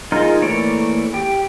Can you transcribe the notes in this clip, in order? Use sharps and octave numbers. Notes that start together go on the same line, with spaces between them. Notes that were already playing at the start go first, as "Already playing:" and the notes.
G#3 D#4 F4 A#4
E3 A3 A#3 C#5 D5
G4